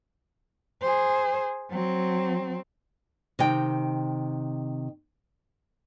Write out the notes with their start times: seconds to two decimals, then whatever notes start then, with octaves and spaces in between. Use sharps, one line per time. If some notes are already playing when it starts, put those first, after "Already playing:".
0.82 G#4 C5
1.70 F#3 C4
3.39 C3 D#3 G5